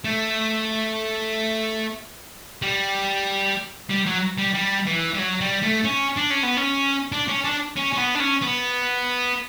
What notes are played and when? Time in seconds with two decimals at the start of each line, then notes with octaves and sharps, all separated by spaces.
0.05 A3
2.62 G3
3.90 G3
4.06 F#3
4.38 G3
4.54 G3
4.87 E3
5.14 G3
5.19 F#3
5.41 G3
5.62 A3
5.84 C#4
6.16 D4
6.30 C#4
6.43 B3
6.57 C#4
7.12 D4
7.28 C#4
7.44 D4
7.77 C#4
7.93 C#4
7.98 B3
8.15 D4
8.20 C#4
8.42 B3